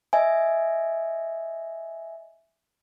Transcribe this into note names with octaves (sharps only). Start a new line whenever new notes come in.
D#5 E5 G#5